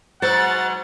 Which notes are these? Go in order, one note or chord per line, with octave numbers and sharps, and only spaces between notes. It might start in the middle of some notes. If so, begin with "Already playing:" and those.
G#2 B2 F#3 C5 F#5 A6